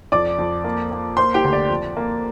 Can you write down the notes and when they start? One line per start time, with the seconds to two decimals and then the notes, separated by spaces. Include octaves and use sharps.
0.12 F2 D5 D6
0.38 F2
0.64 A#3
0.92 A#3
1.17 A#3 C5 C6
1.34 G4 G5
1.44 D2
1.53 D5
1.69 F2
1.97 A#3